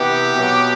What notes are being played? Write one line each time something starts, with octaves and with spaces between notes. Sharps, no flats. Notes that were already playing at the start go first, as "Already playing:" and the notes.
Already playing: C3 E3 B3 G4
B2 F#3 B3